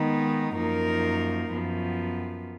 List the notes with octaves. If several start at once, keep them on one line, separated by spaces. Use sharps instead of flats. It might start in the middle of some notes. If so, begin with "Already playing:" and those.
Already playing: D#3 G#3 B3 D#4
F#2 F3 A#3 D#4 A#4
F#2 F3 B3